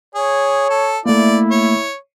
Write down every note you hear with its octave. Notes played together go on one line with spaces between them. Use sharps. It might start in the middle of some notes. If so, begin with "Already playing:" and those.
G#4 C#5
A4
A3 A#3 E4 D5
C#5